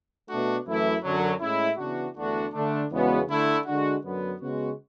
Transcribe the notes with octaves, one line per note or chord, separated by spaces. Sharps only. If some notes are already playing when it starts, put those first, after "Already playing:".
B2 A3 D4 F#4
F#2 E3 A3 E4
F#2 D3 F#3
A2 G#3 C#4 E4
C#3 E3 B3 D4 F#4
E2 D3 A3 D4 F#4
D3 A3 D4
E2 C#3 G#3 B3 F#4
D3 A3 E4
D3 G#3 D4 F#4
F#2 D3 F#3 B3
C#3 G#3 B3 F#4